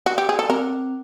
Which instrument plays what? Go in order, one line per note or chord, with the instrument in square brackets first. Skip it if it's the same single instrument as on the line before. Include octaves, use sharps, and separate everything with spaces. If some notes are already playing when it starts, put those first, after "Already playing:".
[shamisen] F#4
G4
G#4
A4
[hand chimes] C4 [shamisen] A#4